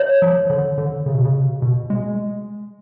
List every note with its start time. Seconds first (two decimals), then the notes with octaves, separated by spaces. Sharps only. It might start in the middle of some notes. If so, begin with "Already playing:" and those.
Already playing: C#5
0.22 F3
0.50 D3
0.78 D3
1.06 C#3
1.14 B2
1.24 C#3
1.62 B2
1.90 G#3